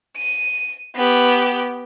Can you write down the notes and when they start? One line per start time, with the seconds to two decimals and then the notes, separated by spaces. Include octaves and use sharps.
0.16 D#7
0.95 B3 G4